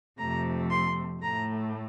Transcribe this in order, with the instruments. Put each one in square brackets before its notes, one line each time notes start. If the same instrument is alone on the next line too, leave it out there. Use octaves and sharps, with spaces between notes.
[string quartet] F2 C3 F3 A3 A#5
C6
A2 A3 A#5